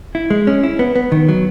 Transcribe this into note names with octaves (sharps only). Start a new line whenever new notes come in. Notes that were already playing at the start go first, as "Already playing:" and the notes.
E4
G#3
C#4
E4
B3
B3
D#3
F#3